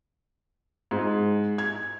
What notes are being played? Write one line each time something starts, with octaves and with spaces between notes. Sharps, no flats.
G#2
G#6